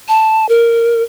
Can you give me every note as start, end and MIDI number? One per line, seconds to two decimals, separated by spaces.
0.08 0.46 81
0.49 1.03 70